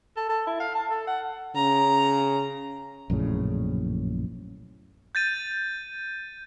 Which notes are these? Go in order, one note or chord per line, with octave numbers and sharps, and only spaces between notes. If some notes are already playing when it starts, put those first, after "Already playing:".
A4
A4
E4
F5
A5
A4
F#5
C#3 A#5
A#1 F#2 A2 C#3
G6 A6 D#7